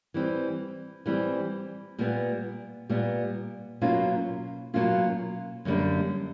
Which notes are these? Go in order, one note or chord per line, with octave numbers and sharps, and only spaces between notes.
E3 G3 C4
E3 G3 C4
A#2 G3 B3
A#2 G3 B3
B2 F#3 A#3 C#4 F4
B2 F#3 A#3 C#4 F4
F#2 D3 G3 A#3